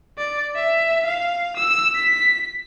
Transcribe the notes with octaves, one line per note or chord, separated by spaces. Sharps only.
D5
E5
F5
E6
B6